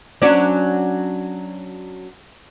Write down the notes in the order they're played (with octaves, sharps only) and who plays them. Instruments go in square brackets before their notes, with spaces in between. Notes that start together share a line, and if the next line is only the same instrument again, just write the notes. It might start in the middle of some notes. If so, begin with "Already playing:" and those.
[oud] F#3 C#4 D4